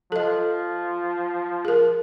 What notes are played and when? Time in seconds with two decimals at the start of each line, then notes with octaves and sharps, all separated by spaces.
0.12 F3 A4 D#5
1.65 G#4 A#4